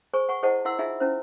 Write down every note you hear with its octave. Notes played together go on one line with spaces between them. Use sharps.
G#4 C5 G#5 C#6
F#5 G#5 C#6
E4 G#4 C5 D#5 F#5 A5
E4 F5 F#5 C6 E6
D#4 F4 G#4 E5 F5 G#5
C#4 E4 C5